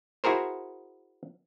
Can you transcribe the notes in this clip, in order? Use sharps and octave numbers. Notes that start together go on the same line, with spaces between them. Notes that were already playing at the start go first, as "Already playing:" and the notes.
E4 F#4 G#4 A#4 C5